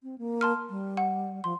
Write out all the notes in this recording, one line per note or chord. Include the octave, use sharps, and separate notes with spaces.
C4
A#3
A5 C6 F6
G3
F#5
F3 C6